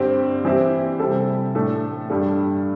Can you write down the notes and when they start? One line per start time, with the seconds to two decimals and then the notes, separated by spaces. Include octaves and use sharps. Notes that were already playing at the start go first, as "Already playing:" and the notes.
Already playing: G2 D3 C4 G4
0.45 E3 C4 E4 G4
1.00 C3 G3 C4 A4
1.55 A2 A3 D4 A4
2.10 G2 D3 G3 D4 A4